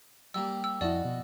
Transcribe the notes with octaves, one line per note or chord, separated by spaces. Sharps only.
G3 A#3 G4 E6
E6
F2 E4 F#4 D5 D#5 A5
B2